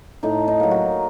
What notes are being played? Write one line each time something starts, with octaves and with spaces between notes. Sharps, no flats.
A2 D#4
D#4
F#3 A#3
F#4